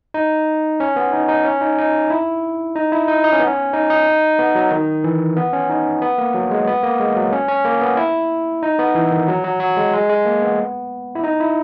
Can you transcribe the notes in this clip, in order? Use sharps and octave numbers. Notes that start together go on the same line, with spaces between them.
D#4
C#4
B3
D#4
D#4
C#4
D#4
D#4
E4
D#4
E4
D#4
D#4
C#4
B3
C#4
D#4
D#4
B3
F#3
D#3
E3
B3
C#4
D#4
B3
A#3
F#3
G#3
B3
A#3
G#3
F#3
C#4
C#4
A#3
B3
E4
D#4
B3
E3
D#3
F#3
F#3
F#3
G#3
G#3
G#3
A#3
B3
E4
D#4
E4